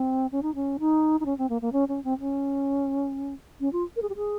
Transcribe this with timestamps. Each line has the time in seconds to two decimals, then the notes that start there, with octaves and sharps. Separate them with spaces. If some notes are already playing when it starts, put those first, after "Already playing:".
Already playing: C4
0.32 C#4
0.43 D#4
0.55 C#4
0.79 D#4
1.20 D#4
1.26 C#4
1.38 C4
1.49 A#3
1.62 A#3
1.72 C#4
1.88 C#4
2.04 C4
2.20 C#4
3.60 C#4
3.73 F4
3.96 A#4
4.02 G#4
4.09 G4
4.16 G#4